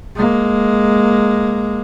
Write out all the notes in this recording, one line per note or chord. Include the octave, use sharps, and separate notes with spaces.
G#3 A#3